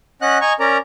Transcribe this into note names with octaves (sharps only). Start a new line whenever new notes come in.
C#4 D#5 F#5 F#6
D#5 G#5 A#5 C#6
C#4 A#4 D5 A#5